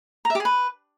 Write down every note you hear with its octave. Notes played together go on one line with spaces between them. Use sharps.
A#5
E5
G4
G#4
B4